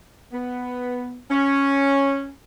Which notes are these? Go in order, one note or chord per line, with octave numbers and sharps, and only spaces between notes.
B3
C#4